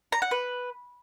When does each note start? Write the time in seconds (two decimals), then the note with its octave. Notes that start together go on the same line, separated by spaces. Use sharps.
0.12 A#5
0.22 F#5
0.31 B4